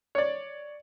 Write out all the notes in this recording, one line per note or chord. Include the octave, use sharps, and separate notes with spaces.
C#5 D5